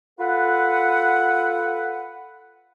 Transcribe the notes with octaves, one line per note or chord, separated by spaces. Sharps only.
F4 A4 B4 F#5